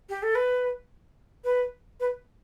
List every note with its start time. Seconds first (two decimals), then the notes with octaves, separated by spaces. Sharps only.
0.09 G4
0.22 A4
0.35 B4
1.44 B4
2.00 B4